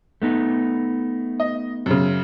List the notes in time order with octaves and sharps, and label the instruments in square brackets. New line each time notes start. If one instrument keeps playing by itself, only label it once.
[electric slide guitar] A3 B3 D#4
[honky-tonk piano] D#5
F#2 C#3